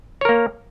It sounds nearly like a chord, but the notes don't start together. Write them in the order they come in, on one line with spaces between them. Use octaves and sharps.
C#5 A#4 A#3